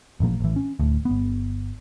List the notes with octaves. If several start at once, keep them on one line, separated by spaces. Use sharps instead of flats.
A1 A#2 F3 A#3
A1 E3
C#4
D1 D2
G1 B3